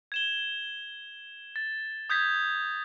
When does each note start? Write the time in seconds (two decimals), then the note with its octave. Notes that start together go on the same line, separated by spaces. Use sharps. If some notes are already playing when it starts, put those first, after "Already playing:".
0.12 G#6 E7 G7
1.56 A6
2.10 D#6 G6 G#6 B6